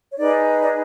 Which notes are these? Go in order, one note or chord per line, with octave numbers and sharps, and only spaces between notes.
C#5
D#4 G#4 B4 D5
D5